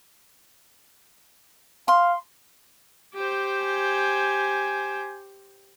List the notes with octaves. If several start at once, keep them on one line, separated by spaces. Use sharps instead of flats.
F5 C6
G4 C5
G#5